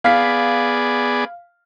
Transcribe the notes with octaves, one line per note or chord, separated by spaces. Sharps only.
B3 G#4 D5 F5 B6